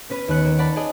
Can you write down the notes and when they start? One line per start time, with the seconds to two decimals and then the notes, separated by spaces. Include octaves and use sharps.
0.09 B3 C#4 B4 D#7
0.28 D#2 B3 F#6 C#7
0.45 A#3
0.58 C#5 D5 F#5 A5 B5
0.76 G#4 D5 D#5